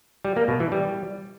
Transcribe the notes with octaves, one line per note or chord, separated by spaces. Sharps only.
G3
A#3
B2
E3
G3